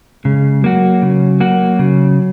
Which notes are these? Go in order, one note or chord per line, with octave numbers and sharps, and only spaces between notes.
C#3 G#3
F#3 A#3 F#4
C#3
A#3 F#4
C#3